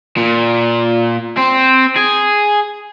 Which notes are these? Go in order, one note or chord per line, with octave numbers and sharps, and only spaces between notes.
A#2
C4
G#4